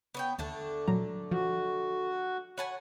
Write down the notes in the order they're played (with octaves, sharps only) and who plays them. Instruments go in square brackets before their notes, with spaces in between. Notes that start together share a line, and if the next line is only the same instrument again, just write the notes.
[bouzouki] B3 C#5 G5
[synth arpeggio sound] D#2 A5 [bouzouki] D3 A3 D4
[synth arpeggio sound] A#2 F#3 A#5
[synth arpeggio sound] F3 [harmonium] F#4
[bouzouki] C#5 F#5 G#5 [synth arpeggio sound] A5 B5 F#6